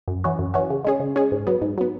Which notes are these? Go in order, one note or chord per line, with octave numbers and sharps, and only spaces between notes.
F#2
E3 C#4 F#4
F#2
E3 C#4 F#4
C#3
G#3 C#4 G#4
C#3
G#3 C#4 G#4
G#2
F#3 B3
G#2
F#3 B3